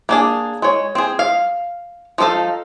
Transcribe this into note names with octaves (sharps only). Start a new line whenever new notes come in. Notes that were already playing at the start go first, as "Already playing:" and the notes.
A#3 D4 G#4
G#3 C#5
C4 G#4
F5
F3 A3 D#4 A4 F5